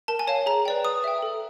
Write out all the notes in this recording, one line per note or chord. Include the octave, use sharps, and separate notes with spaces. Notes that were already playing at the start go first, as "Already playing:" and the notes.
A#4 A5
G#5
C#5 F5 A5
G#4 A#5
B4 D5 G5
B4 D#6
E5 G5
A4